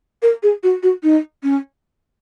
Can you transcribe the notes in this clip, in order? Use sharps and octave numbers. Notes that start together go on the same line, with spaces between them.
A#4
G#4
F#4
F#4
D#4
C#4